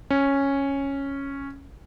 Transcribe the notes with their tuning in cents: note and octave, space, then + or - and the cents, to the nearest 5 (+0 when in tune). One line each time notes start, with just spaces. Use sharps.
C#4 -5